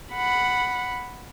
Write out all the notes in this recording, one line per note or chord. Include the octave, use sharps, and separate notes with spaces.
F#5 B5